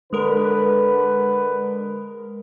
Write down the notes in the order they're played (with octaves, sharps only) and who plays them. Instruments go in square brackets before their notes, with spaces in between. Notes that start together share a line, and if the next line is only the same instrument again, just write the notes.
[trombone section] D3 B4 [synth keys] G#3 A#4